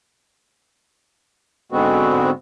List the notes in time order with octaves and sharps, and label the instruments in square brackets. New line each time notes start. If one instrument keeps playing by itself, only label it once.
[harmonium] G#2 D3 G#3 B3 C4 F#4